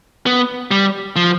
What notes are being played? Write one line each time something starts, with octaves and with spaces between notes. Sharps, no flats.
B3
G3
F3